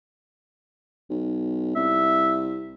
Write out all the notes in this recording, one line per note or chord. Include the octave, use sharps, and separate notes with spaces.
B1
C2 E5